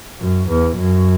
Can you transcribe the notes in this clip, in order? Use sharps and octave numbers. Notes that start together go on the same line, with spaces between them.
F#2
E2
F#2